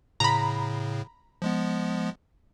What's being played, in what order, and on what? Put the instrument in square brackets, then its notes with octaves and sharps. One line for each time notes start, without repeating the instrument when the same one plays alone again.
[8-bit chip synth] A2 C#3 [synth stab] A#5 B5
[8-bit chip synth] F3 G#3 B3